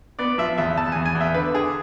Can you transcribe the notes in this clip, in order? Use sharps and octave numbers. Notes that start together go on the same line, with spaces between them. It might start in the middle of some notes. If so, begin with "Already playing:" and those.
B3 D5
F3 E5
E2 E5
E2 A5
E2 G#5
G#5
E2
E5
D3 B4
D3 G#4